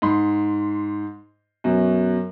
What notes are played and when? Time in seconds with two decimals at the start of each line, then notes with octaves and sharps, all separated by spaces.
0.02 G#2 C6
1.64 F#2 B2 F#3